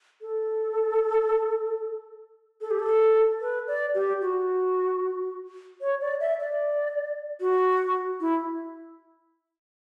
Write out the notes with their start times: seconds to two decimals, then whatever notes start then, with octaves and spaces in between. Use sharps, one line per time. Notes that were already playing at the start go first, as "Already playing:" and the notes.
0.21 A4
2.61 A4
2.71 G4
2.79 A4
3.41 B4
3.68 D5
3.95 G4
4.21 F#4
5.81 C#5
6.01 D5
6.20 E5
6.40 D5
7.40 F#4
8.21 E4